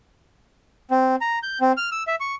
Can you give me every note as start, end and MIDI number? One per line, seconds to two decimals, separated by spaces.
0.91 1.16 60
1.21 1.39 82
1.43 1.58 91
1.61 1.72 60
1.77 1.90 89
1.92 2.03 88
2.07 2.15 76
2.20 2.35 85